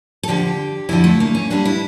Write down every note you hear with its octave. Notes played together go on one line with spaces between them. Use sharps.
A4
F2 D3 F3 G4
F2 D3 F3 E4
A3
A#3
C#4
G2 D3 G3 D4
E4